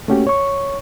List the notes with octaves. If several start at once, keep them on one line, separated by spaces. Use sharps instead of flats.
A3 A#3 C#4 F#4 G4
C#5 C#6